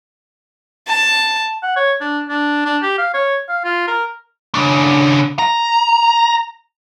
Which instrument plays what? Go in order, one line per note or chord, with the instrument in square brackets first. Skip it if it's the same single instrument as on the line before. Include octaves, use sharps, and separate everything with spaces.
[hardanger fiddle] A5
[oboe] F#5
C#5
D4
D4
D4
G4
F5
C#5
F5
F4
A#4
[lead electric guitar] C#3 D4
A#5